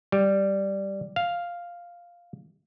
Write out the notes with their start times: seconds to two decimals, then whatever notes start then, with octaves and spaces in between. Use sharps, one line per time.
0.12 G3
1.16 F5